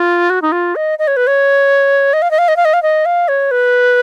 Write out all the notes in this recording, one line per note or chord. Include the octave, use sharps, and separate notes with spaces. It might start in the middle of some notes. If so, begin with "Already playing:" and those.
Already playing: F4
F#4
D#4
F4
D#5
D#5
C#5
B4
C#5
D#5
F5
D#5
F5
D#5
F5
D#5
F5
D#5
F5
C#5
B4